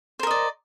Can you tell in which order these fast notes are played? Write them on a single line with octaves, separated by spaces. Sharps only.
C5 A#4 D#5 D5